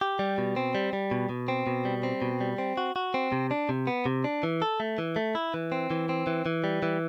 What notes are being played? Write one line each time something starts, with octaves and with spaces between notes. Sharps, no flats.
G4
G3
B2
C4
G3
G3
B2
B2
C4
B2
G3
C4
B2
G3
C4
F#4
F#4
C4
C3
D4
C3
B3
C3
D4
E3
A4
A3
E3
A3
E4
E3
C4
E3
C4
E3
E3
G3
E3